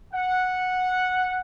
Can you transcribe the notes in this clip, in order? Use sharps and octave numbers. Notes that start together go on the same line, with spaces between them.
F#5